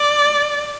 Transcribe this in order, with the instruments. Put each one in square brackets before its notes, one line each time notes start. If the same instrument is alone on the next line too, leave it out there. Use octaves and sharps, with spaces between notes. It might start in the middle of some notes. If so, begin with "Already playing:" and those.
Already playing: [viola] D5